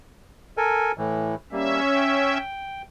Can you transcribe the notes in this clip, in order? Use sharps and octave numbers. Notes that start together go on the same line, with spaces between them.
A4 A#4 G#5
A2 E3
G3 A#3 C#4 E5
G5